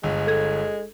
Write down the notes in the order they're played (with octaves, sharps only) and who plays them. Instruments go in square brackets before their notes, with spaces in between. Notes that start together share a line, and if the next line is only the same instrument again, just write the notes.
[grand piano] G1 [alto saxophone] G#3
[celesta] A4 G#6